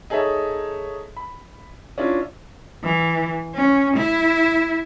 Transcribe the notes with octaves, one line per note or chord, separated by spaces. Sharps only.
D#4 G#4 A4 C#5 E5
B5
C#4 D4 E4 F4
E3
C#4
E4